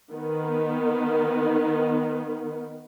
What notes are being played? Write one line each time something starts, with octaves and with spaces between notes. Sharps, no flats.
D#3 B3